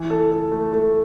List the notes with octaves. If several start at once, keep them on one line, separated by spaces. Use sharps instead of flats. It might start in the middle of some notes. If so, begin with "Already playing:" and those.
Already playing: E3
A4
A4
A3
A3